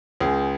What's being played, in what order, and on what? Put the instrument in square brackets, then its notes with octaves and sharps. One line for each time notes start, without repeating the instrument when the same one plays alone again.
[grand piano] C#2 G#4